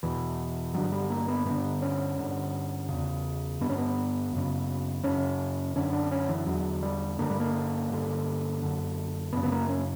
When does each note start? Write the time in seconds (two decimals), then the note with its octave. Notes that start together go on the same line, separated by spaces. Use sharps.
0.03 E2 B2 E3
0.74 G2 D3 F#3
0.92 G3
1.10 A#3
1.28 B3
1.46 G2 D3 B3
1.82 C#4
2.18 G2 D3
2.89 E2 C#3
3.61 G2 D3 B3
3.70 C#4
3.78 B3
4.33 F#2 C#3
5.03 F#2 C#3 C#4
5.75 F#2 D3 C#4
5.93 D4
6.11 C#4
6.29 E3
6.46 E2 D3 F#3
6.83 G3
7.19 G2 D3 A#3
7.30 G3
7.40 A#3
7.90 G2 D3
8.62 F#2 D3
9.33 F#2 C#3 B3
9.43 B3
9.52 A#3
9.69 C#4